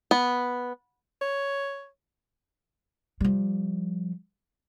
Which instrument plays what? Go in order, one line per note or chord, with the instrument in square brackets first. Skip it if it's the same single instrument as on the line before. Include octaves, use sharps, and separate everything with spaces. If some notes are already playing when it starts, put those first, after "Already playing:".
[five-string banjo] B3
[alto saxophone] C#5
[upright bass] F3 G3